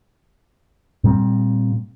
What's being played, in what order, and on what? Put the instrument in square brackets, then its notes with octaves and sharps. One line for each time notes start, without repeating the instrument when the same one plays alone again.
[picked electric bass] A#2 G3 C4